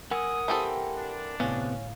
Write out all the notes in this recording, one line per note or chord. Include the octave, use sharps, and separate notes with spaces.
A#4 F#5 G#5 D#6 E6
E3 C4 G4 A4 G5 A5
D4
G1 A2 C3 B3 C#4 F5